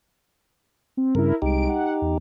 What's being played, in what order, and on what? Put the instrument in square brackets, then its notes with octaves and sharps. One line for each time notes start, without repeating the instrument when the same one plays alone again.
[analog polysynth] C4
[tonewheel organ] G2 C#3 [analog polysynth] E4 A#4
[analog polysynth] C2 G#3 D7 [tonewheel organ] D#4 G4
[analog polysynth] F#5
E2